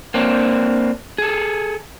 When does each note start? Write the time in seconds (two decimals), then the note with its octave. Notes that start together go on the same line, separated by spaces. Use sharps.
0.14 A#3 C4 D4
1.18 G#4 A4